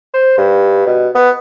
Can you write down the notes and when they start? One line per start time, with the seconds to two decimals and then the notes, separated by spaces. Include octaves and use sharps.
0.14 C5
0.37 G2
0.86 B2
1.15 B3